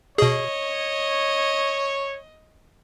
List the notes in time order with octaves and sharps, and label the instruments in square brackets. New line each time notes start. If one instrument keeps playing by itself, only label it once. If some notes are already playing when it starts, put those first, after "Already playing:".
[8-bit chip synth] B2 G#4 [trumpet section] C#5 [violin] D#5